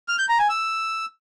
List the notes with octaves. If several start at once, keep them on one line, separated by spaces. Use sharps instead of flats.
F6
G6
A#5
G#5
E6